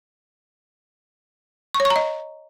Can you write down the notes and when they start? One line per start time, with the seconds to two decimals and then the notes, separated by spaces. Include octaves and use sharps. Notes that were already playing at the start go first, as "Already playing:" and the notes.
1.74 C#6
1.80 C#5
1.85 C#6
1.90 A#5
1.96 D#5